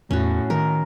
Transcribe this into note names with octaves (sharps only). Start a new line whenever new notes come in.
E2 A2 C#4 F#4
D#3 A#4